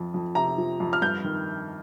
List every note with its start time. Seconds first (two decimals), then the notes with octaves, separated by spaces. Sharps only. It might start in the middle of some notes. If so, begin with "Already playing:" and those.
Already playing: F2 F3
0.14 F2
0.35 C3 A#5
0.58 F3
0.80 F2
0.93 F6
1.02 G2 G6
1.24 D#3